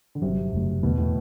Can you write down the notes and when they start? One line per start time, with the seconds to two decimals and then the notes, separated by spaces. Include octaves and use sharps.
0.15 D3
0.22 G1 G2 C3 F#3
0.53 F#1 F#2 F#3 A3
0.83 E2 B2 D3 A3
0.98 A2